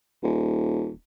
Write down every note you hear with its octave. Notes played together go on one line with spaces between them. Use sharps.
D#1